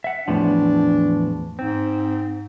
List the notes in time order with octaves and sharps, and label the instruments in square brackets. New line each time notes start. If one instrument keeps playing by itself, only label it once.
[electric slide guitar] E5 F#5
[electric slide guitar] E2 A2 F3 [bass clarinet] D4
[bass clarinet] G#2 [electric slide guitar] C4